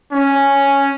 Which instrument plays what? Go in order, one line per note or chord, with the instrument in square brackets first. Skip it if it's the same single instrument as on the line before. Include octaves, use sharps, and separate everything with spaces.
[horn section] C#4